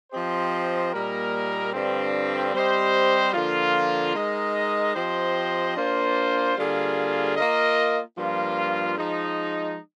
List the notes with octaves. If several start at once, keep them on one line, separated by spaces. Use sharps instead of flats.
F3 C4 G4 C5 D#5
A#2 G3 A#3 D#4 A#4
G2 D3 F3 C4
G3 C4 G4 C5 D#5
D3 F3 A#3 F4
G#3 D#4 A#4 D#5
F3 C4 G4 C5 D#5
A#3 D4 F4 C5
D3 G3 A#3 F4 G#4
A#3 F4 A#4 D#5
G2 F3 A#3 F4
F3 G#3 D#4